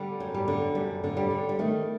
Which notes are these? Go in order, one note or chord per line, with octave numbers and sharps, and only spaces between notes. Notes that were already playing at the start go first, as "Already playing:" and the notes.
Already playing: D3 G3
F#2
G3
D3
F#2 G3
D3
G3
D3
G3
D#3 A3